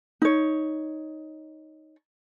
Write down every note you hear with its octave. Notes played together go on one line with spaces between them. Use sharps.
D#4 C#5